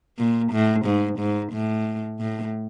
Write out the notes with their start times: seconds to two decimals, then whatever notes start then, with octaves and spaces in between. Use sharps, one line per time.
0.18 A#2
0.52 A2
0.85 G#2
1.19 G#2
1.52 A2
2.19 A2